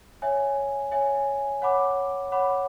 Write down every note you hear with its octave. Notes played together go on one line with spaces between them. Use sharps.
C#5 E5 G#5
C#5 E5 G#5
C#5 F#5 B5 D6
C#5 F#5 B5 D6